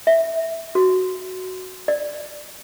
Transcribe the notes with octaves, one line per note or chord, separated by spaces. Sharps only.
E5
F#4
D5